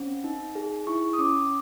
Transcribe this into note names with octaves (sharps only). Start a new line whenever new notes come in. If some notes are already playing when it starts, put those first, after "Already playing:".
Already playing: C4 C#4
D#4
G#4
E4 C#6
D#6
C#4 D6